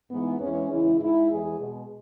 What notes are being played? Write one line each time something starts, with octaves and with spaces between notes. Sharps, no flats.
G#2 E3 G#3 B3
E2 E3 G#3 C#4
E2 C#3 E3 G#3 E4
G#2 G#3 E4
E2 E3 G#3 G#4
B2 G#3